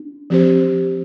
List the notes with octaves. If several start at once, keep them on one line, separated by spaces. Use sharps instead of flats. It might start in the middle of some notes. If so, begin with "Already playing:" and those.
Already playing: D4
F3 C4 G4 C5